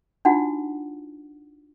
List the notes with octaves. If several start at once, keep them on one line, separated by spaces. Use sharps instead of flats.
D4 D#4 F4 F#4 F#5